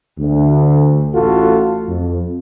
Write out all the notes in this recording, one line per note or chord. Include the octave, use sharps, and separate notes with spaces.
D2
A1 A3 F4 F#4 A4
F2